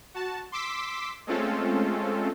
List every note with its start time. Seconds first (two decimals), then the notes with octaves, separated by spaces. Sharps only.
0.14 F#4 A5
0.52 C6 D6 E6 B6
1.27 G#3 A3 C4 C#4 F4 A4